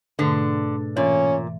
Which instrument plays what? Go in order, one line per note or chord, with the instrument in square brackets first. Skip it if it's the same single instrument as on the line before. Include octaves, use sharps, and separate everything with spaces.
[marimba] G#2 B2 A3 [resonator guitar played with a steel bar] D3
[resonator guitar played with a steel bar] A#2 [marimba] E3 [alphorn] C#4